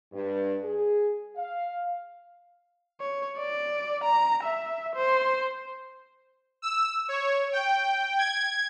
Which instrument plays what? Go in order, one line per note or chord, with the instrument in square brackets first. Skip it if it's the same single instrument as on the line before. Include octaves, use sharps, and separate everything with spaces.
[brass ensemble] G2
G#4
F5
[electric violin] C#5
D5
A#5
E5
C5
[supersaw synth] E6
C#5
G5
G#6